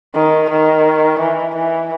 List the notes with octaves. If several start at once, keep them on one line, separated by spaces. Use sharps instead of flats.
D#3
D#3
E3
E3